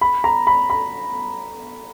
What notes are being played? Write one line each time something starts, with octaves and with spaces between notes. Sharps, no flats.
B5
A#5
B5
B5